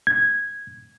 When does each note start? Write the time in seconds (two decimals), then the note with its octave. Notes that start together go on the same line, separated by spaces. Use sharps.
0.07 G#6